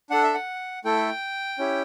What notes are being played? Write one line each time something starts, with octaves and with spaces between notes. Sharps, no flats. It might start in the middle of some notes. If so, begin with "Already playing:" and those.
D4 A4 F#5
E5
F#5
A3 E4 A4 G5
C#4 E4 G4